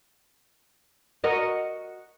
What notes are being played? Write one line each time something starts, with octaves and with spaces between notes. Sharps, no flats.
F#4 A#4 D#5